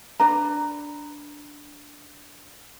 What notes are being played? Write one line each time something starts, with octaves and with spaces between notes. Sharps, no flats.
D4 B4 A#5